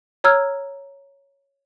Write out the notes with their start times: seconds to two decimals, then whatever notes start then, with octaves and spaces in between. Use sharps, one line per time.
0.24 C#5 A#5 E6 F6 G#6